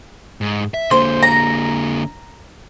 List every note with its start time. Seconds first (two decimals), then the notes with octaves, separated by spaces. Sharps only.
0.41 G#2
0.74 E5
0.91 D3 A#3 C5
1.23 A#5